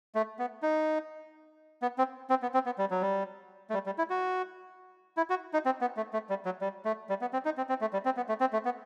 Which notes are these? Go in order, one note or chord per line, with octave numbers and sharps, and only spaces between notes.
A3
B3
D#4
B3
C4
C4
B3
C4
B3
G3
F#3
G3
A3
G3
G3
E4
F#4
E4
F#4
D#4
C4
B3
A3
A3
G3
F#3
G3
A3
G3
B3
C4
D#4
C4
C4
A3
G3
C4
B3
A3
C4
A3
B3